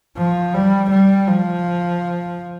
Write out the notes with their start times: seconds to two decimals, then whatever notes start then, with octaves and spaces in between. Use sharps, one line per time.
0.17 F3
0.54 G3
0.91 G3
1.28 F3